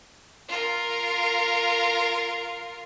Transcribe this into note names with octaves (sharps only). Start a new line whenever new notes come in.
F4 A#4